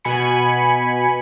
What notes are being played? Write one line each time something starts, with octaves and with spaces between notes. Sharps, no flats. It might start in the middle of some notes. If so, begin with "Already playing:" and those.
B2 G#5 B5 C#7